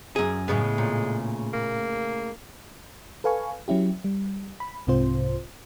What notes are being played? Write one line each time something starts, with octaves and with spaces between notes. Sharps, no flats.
F#2 G#4
A2 C#3 G#3 B3
A#2
A#3
A4 B4 F5 G#5 C#6
F#3 C#4 E4 G4
G3
B5
C2 G#2 C3 C4 F4 C5